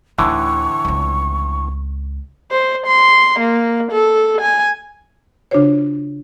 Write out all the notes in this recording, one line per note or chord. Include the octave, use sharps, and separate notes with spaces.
D2 A2 D3 E3 D#4 C#6
C#2 C4
C5
C6
A#3
A4
G#5
C#3 D4 F4 F#4 C5 C#5